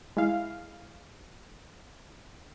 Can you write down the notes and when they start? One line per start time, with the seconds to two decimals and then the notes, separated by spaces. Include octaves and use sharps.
0.17 G#3 E4 F5